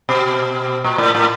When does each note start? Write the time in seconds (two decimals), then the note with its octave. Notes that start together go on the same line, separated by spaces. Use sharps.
0.09 B2
0.84 A#2
0.98 A2
1.15 A2